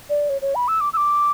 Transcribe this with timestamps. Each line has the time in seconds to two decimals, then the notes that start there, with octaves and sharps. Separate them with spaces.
0.10 D5
0.29 C#5
0.42 C#5
0.55 B5
0.68 E6
0.81 D6
0.93 E6
0.97 D6